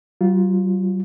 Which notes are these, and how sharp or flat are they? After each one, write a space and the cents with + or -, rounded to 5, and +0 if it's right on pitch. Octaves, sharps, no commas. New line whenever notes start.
F#3 +45 F4 +0